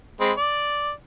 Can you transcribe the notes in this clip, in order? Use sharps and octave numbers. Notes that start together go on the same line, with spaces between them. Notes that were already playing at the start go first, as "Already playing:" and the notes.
G#3 C4 B5
D5